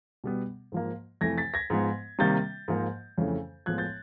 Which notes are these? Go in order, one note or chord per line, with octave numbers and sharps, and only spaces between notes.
B2 G3 B3
G#2 F3 A#3
F2 C3 E3 A3 G#6 A#6
A6 B6
G#6 A#6
G#2 F3 G#3 B3
C3 D#3 G3 A#3 G6 A6
G#2 F3 A#3
F2 C#3 E3 A3
A2 F3 G#3 B3 F#6 G#6
G6 A6